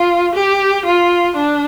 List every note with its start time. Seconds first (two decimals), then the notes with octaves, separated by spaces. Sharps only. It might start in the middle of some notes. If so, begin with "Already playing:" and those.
Already playing: F4
0.35 G4
0.85 F4
1.36 D4